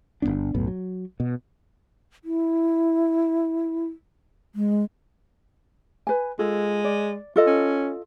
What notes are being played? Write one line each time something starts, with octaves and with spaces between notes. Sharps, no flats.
G1 G#2 B3 D4
B1 F#2 A2 B3
F#3
B2
E4
G#3
B4 G#5
G#3 F4 A4
D5
F4 A4 D#5
C#4